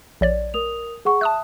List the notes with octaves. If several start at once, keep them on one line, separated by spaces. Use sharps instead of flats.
A#1 C#5 D5
A#4 D#6 F7
G#4 F#5 C#6
E5 A5 D#6 F#6